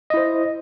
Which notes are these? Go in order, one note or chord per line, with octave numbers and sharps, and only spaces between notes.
E4 C5 D#5